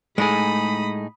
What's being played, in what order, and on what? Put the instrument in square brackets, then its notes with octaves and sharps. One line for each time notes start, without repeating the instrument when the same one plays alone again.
[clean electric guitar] A2 D#4 G#4 [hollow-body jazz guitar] G#3 A3 [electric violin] B5 D#6